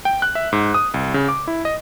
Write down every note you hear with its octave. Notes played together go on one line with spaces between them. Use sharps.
G5
F#6
E5
G#2
D#6
C2
C#3
D6
E4
D#5